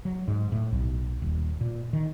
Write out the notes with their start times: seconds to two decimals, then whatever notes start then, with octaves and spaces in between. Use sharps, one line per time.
0.05 F#3
0.28 G#2
0.52 A2
0.72 B1
1.22 D#1
1.61 A#2
1.93 D#3